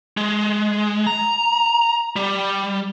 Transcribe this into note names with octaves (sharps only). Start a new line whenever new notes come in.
G#3
A#5
G3